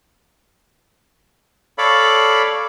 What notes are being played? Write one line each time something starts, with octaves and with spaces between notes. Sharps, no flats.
A4 C#5 D5 F5 B5